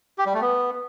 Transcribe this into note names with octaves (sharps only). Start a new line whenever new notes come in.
G4
G3
A3
B3